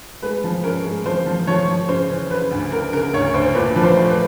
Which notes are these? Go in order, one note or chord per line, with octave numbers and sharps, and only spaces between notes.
G#3 B4
F3
C#4 A#4
G#3
F3 C5
F3
F3 C#5
F3
C#3 C5
E3
C#3 B4
D2
C#3 A#4
C#3 A#4
D2 C#5
D2 C5
A#2 B4
F3 B4
C5
A3
B4